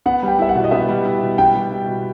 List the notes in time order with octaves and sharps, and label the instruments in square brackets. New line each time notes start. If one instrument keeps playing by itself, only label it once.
[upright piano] B3 [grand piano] F#5
[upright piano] G3
[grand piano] G5
[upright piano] E4 [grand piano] E5
[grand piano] F#5
[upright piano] B2
[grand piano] D#5
[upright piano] B3 [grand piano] E5
[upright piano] G3
E4
B2
[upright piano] B3 [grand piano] G5
[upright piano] G3
E4
B2